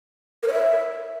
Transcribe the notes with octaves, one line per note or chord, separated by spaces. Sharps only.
A#4
C#5
E5